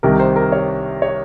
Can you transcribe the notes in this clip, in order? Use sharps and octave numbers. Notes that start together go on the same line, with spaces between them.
C2 C3 D#3 A#4
C5
A#4
C#5
C#5